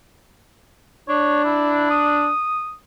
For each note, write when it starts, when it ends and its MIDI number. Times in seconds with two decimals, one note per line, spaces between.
1.08 2.29 62
1.08 1.44 73
1.45 1.90 64
1.90 2.74 87